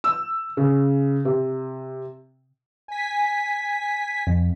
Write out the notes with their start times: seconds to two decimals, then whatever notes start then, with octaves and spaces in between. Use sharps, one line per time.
0.04 E6
0.57 C#3
1.25 C3
2.88 G#5 B6
4.27 F2